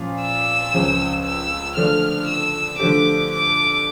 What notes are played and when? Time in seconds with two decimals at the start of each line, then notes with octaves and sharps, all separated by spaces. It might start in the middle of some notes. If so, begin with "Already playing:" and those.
Already playing: A#2 F3 C#4 F4
0.21 E6
0.73 C#2 C#3 F3 C#4
1.25 E6
1.76 D3 F3 A3 D4 F6
2.28 E6
2.79 D3 F3 A3 D4 G4 D6
3.31 D6